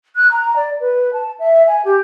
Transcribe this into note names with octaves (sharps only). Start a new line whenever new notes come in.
F#6
A#5
D5
B4
A5
E5
G#5
G4